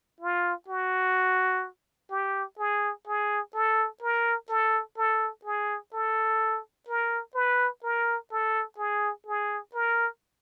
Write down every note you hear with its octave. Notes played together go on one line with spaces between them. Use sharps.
F4
F#4
G4
G#4
G#4
A4
A#4
A4
A4
G#4
A4
A#4
B4
A#4
A4
G#4
G#4
A#4